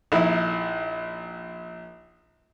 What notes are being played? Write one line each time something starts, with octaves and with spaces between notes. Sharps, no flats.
A#1 D#4 E4